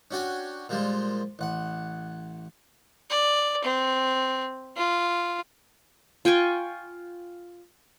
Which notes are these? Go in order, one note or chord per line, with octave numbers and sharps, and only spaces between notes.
C#4 D4 F#4 G5 G#5
A#2 F3 G3 G#3
A1 F#5
D5
C4
F4
F4 G5 G#5 C#6